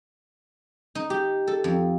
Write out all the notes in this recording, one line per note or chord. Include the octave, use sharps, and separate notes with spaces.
D#4
G4
A4
F2